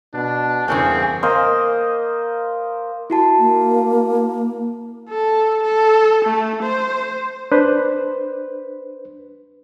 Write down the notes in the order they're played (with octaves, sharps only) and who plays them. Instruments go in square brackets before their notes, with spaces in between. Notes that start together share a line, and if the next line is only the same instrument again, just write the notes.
[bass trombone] B2 [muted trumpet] D4
[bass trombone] E2 [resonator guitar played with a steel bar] G2 C#3 A#3 [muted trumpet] C4 [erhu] G#4
[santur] A#3 A#4 C5 D#5
[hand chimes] E4 F#4 A5
[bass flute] A#3
[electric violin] A4
A4
A3
C5
[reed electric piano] D4 B4 C5